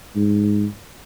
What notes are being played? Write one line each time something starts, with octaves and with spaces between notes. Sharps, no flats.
G#2